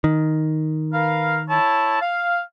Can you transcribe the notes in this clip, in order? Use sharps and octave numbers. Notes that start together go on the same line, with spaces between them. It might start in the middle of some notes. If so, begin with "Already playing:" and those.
D#3
A#4 B4 F5
E4 C#5 A5
F5